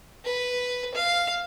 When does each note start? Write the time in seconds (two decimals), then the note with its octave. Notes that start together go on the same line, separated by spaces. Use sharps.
0.25 B4
0.94 F5